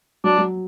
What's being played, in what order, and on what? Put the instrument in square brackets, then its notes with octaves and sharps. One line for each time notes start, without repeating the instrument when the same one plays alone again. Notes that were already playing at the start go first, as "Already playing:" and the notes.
[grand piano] F#3 [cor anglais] D4
[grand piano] F#3